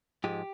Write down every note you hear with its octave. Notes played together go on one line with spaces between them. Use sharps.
G#2 F3 G#3 G4